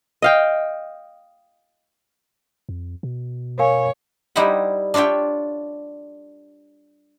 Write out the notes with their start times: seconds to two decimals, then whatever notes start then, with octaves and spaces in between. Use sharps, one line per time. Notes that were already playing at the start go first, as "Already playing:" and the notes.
0.22 D#5 F5 G5
2.69 F2
3.03 B2
3.59 A#4 C#5 F5 G#5
4.36 G3 D#4 E4 C5 E5 F#5
4.94 D4 F4 C#5 E5 G5